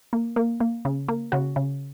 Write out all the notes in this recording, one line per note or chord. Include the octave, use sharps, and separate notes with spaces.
A#3
A#3
A#3
C#3
A#3
C#3 F#4
C#3